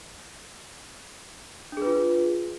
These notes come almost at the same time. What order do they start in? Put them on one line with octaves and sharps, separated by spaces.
D4 G#4 B4 F4